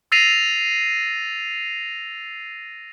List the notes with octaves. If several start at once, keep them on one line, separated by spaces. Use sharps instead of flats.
E6 A6 A#6 C7 D#7 F7